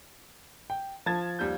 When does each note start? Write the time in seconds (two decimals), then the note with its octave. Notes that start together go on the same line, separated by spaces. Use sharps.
0.70 G5
1.06 F3 A5 G#6 A6
1.39 D#2 G3 G6